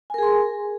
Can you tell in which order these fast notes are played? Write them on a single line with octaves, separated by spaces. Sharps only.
G#5 A#4 G#4 C6